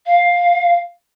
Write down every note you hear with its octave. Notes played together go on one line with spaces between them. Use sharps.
F5